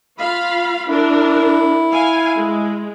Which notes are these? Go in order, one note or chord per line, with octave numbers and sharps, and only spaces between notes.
F4 F5 B5
D4 E4 A#4
F5 G#5
G#3